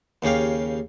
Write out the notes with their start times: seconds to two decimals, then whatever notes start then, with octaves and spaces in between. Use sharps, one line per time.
0.22 D#2 C#3 C#4 G4 F5